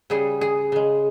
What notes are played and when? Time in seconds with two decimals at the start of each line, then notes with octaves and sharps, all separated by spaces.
0.10 C#3 G3 G#4
0.41 G#4
0.72 C#3 G#3